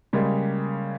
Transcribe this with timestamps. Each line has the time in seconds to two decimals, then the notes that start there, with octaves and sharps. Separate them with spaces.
0.13 C#3 G3 G#3 A#3